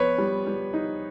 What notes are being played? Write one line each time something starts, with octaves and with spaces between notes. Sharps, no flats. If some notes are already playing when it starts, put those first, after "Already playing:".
Already playing: F3 B3 B4 C#5
G3
G3
D#4